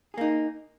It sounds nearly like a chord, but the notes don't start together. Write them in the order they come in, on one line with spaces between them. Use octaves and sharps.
G#4 A#3 D#4